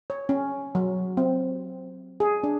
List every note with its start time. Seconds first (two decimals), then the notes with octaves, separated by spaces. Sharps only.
0.10 C#5
0.29 C#4
0.75 F#3
1.17 C4
2.20 G#4
2.44 D4